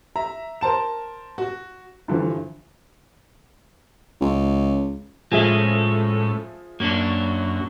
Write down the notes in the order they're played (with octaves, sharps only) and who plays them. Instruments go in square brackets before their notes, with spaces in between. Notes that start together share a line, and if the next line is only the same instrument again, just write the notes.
[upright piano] E5 A#5
A#4 C5 A5 E7
F#4
G2 D3 E3 F3
[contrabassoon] C#2
[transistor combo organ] A2 [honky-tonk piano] F3 G#4 E5 [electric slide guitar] G#3 C#4
[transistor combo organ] F#2 [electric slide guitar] A#3 C#4 D4